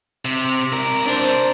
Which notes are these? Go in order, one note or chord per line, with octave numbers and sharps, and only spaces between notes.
C3
C3 A#4
D4 C5